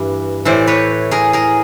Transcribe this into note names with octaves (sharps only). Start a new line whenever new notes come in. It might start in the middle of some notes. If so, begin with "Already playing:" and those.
Already playing: G2 E3
A2 E3 C5 D5
B4 C#5
G#4 A#4
G#4 A#4